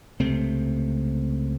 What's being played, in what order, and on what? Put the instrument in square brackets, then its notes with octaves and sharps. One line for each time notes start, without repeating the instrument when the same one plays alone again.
[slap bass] C#2 C3 A3 C4